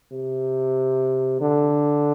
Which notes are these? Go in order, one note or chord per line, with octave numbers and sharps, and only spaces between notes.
C3
D3